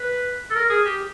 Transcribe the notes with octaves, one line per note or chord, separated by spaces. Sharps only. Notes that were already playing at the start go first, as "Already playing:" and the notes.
Already playing: B4
A4
A#4
G#4
G4